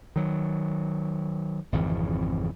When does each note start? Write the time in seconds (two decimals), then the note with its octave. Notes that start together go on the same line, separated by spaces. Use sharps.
0.16 D#3 F#3
1.72 G#1 F2 C#3 E3